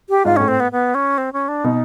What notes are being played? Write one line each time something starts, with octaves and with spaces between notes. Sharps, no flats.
G4
G#2 F4
A2 C#4
C4
B3
B3
C#4
C4
C#4
D4
B2 D#4